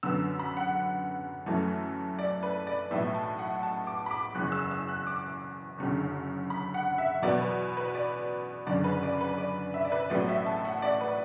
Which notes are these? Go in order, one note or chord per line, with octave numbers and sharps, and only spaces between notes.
F#2 D3 B3 E6
B5
F#5
F#2 E3 A3
D5
B4
D5
B1 A2 E3 B3 E5
A5
F#5
A5
D6
B5
D6
F#1 E2 E3 F#6
E6
E6
F#6
D6
F#1 F#2 D3
B5
F#5
E5
E2 B2 F#3 B3 D5
B4
B4
D5
F#1 F#2 D3 D5
B4
D5
B4
D5
E5
D5
B4
A1 A2 F#3 B3 D5
E5
A5
F#5
D5
B4